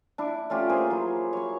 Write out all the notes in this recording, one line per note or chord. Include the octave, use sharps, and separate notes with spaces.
D4 E4
A3 C#4 F4 G4
A#3 G#4 C5
F#3 E4
C#5 C#6